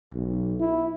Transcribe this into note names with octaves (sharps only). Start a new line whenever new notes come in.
B1
E4